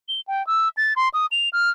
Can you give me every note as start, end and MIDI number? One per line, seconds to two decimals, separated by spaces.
0.08 0.21 103
0.27 0.45 79
0.47 0.69 88
0.77 0.94 93
0.96 1.09 84
1.14 1.26 87
1.31 1.49 101
1.53 1.70 89